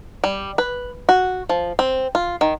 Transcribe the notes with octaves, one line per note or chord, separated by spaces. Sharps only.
G3
B4
F#4
F3
C4
F4
D#3